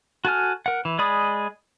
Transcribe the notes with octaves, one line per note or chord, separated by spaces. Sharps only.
F#4 A4 G#5 F6
A#4 F#5
E3
G#3 G#4 D5 B5 D#6